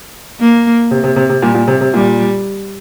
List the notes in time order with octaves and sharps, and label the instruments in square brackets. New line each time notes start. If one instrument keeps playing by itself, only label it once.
[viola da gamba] A#3
[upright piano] C3
C3
C3
C3
[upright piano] A#2 [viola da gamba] G3
[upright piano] A#2
C3
C3
[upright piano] A#2 [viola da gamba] G3